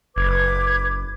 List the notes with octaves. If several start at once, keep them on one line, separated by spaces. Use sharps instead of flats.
F#1 B4 D6 G#6